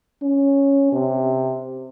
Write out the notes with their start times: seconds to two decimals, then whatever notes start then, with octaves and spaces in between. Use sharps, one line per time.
0.22 C#4
0.92 C3